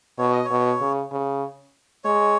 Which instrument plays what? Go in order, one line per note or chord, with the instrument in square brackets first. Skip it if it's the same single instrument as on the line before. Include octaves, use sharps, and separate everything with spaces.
[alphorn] B2 [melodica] C#5
[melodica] D#5
C#5
[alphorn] B2
C#3
C#3
[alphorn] G#3 [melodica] C#5